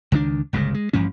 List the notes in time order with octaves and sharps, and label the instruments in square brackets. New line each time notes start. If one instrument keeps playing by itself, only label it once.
[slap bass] C#2 D#3 F#3 D4
G1 C#2 A#2 C#3
G#3
A1 G2 F3 C#4